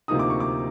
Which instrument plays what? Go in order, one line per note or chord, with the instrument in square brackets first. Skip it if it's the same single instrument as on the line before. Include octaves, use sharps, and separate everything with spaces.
[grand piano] D2 C3 F3 A#3 D#4 D#6
D6
C#6
D6